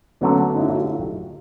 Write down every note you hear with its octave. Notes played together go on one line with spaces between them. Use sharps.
D3 F#3 A3 B3 C#4
D#4
D4 E4
E4 F#4
F4 G4